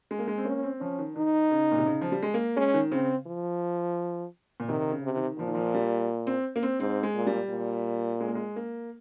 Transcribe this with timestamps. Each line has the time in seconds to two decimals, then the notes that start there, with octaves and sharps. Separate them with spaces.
0.11 G#3
0.19 A#3
0.28 G#3
0.38 C4
0.45 A#3 C#4
0.63 C4
0.80 F3 C#4
0.99 D#3
1.16 D#3 D#4
1.51 C#3
1.72 A#2
1.78 C3
1.86 C#3
2.01 F3
2.12 G3
2.23 G#3
2.34 A#3
2.56 G#3 C#4
2.74 D#3
2.92 C#3 C4
3.27 F3
4.60 A#2
4.69 C3 D#3
4.91 C#3
5.03 C3
5.16 D#3
5.39 A#2 F3
5.47 D#3
5.55 F3
5.74 G3
6.27 C4
6.56 A#3
6.63 C4
6.80 G#2 C4
7.03 G#3
7.15 A#2
7.27 G3
7.50 A#2
8.20 G#3
8.28 A#3
8.35 G#3
8.56 A#3